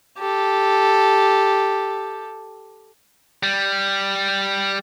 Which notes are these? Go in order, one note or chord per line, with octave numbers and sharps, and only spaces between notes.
G4 A4
G3